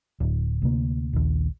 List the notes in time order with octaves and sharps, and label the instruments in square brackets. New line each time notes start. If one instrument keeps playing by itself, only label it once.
[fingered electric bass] D1
D2 C3 A#3
A#1 D#2